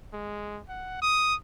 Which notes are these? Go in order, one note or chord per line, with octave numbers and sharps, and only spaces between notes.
G#3
F#5
D#6